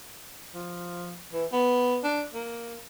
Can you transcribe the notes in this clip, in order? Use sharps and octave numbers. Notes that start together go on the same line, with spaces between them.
F3
E3
B3
D4
A#3